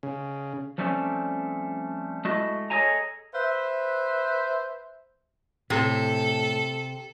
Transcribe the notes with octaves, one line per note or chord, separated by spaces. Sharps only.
C#3
F3 G3 A3 C4 C#4
G#3 A3 E4 F#4 D#5
G#4 A4 C#5 D#5 G#5 A#5
B4 C5 E5
A2 C3 A4